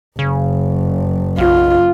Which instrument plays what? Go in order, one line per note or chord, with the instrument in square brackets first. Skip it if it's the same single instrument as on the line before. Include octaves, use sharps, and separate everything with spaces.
[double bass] F#1 [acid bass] C#3
[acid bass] B1 [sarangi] F4